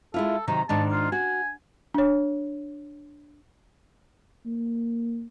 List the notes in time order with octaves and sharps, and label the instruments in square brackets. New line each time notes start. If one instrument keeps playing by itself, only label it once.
[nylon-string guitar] G#3 E4 F4 [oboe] A4
[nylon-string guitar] C3 D#3 F#3 [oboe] A#5
[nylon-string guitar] G#2 D#3 D4 [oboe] A5
[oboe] F4
[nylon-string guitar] F#4 [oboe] G#5
[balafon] D4 C#5
[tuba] A#3